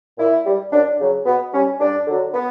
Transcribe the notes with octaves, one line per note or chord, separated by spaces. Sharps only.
A#2 E4
G3
F#2 D4
C#3 F#3
B2 B3
G3 C#4
G2 D4
D3 F#3
B3